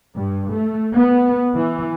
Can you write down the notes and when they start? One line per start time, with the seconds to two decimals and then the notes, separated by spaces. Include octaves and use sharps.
0.15 G2
0.51 A3
0.94 B3
1.56 E3